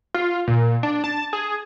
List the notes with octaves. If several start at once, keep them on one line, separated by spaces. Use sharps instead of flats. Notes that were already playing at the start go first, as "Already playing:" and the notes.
F4
A#2
D4
A5
G#4